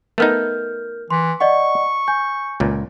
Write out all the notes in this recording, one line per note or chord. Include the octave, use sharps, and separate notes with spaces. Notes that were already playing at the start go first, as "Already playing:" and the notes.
A3 B3 D#4 A#4 F6 G6
E3 C6
D5 D#5 F#5 C#6
G#5 G6
C#2 A#2